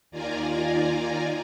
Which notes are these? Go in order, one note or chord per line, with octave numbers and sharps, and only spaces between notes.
D#2 D#3 F4 D5 G#5 A#5